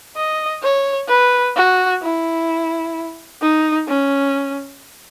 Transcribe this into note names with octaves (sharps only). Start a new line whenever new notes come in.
D#5
C#5
B4
F#4
E4
D#4
C#4